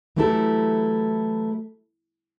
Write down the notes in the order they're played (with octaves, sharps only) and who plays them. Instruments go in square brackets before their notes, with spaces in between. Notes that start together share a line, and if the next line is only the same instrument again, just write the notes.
[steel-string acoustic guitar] E3 F#3 A3 E4 G4 A4